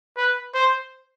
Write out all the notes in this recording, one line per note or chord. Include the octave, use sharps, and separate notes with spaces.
B4
C5